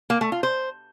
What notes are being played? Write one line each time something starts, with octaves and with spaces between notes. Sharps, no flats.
A#3
A3
F4
C5